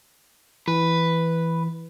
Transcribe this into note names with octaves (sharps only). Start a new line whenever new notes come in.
E3 B4